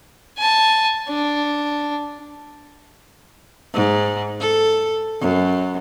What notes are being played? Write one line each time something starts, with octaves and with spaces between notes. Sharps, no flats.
G#5 A5
D4
G#2
A4
F#2